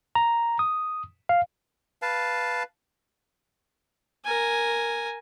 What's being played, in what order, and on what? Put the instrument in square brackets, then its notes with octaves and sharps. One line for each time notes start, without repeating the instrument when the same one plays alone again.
[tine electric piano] A#5
D#6
F5
[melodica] B4 F5 A5
[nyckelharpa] A#4 G#5